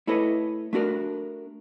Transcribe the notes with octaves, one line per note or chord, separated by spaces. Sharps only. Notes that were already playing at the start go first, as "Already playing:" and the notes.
A3 E4 A4 B4 C#5 D#5
A3 D4 F#4 A#4